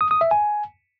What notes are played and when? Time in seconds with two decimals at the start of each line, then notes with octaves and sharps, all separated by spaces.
0.01 D#6
0.11 D#6
0.21 E5
0.31 G#5